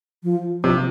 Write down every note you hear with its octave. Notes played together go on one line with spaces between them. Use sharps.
F3
C3 F3